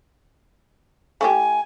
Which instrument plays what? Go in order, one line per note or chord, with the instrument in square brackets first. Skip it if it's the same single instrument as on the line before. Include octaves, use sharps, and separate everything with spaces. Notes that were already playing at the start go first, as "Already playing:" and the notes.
[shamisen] A3 E4 G4 [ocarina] G#5